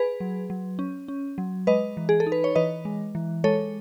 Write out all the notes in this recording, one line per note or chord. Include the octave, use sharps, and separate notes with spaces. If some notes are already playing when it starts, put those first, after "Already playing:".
Already playing: G#4 B4
F#3
F#3
C#4
C#4
F#3
G#3 B4 D#5
E3
G#4
A4
D#4
B4
C#5
E3 B4 D#5
G#3
E3
G#3 A4 C#5